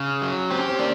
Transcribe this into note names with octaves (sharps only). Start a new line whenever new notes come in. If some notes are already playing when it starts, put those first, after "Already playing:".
Already playing: C#3
F#3
C4 G4
C#4
C4
A#3 D4